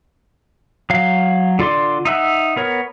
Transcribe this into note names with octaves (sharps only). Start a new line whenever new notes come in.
F#3 F5
D3 F4 D5 C6
D#4 E5 F#5
B3 A#4 C#5